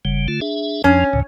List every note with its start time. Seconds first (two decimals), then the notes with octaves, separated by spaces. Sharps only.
0.05 F#1 C#3 G3
0.28 D3 A3 F4
0.41 D4 G#4 E5
0.84 F2 F3 C#4
1.13 D2 A2 C#3